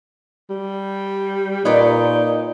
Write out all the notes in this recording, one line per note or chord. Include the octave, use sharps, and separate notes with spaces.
G3
A#2 D#4 B4 C#5 D5